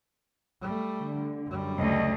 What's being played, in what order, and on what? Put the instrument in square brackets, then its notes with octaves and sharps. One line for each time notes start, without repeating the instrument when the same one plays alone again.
[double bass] G3 A3
[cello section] D3
[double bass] F#2 G3
[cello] D2 [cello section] C#3 D#5